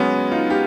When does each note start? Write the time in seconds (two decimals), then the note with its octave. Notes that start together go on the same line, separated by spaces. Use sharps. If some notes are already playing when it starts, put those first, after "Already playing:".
Already playing: F#3 G#3 B3 C#4
0.31 D#4 F4
0.50 F4 G4